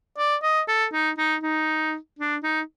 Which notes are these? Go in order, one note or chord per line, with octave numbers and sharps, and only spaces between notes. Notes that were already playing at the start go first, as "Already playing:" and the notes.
D5
D#5
A4
D#4
D#4
D#4
D4
D#4